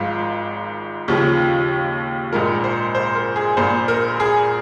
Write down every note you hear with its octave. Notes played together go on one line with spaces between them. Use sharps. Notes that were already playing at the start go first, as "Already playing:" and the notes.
Already playing: G#1 G#2 F3 F4
D#2 C#3 F3
A#1 G#2 F3 A#4
C5
C5
A#4
G#4
A#1 A#2 F3 C5
A#4
G#4